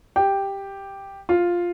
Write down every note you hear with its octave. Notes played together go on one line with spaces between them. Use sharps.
G4
F4